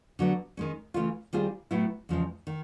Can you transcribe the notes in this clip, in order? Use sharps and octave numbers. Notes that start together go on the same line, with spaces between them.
D3 F#3 B3
D#3 G#3 C#4
C#3 E3 A3 C#4 F4
D#3 G3 C4 F4 G#4
A2 F#3 B3 E4
E2 C#3 F3 G#3
D#3